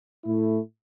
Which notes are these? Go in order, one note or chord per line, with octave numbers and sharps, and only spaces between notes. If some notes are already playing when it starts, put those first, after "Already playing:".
A2 A3 E4